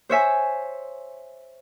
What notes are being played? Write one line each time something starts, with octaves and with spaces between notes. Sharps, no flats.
C5 C#5 E5 G#5